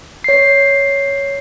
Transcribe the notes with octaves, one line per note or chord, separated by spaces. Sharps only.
C#5 C7